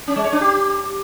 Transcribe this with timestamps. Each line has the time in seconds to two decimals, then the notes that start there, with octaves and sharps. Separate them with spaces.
0.08 C#4
0.16 G#3
0.24 C#5
0.33 D4
0.41 G4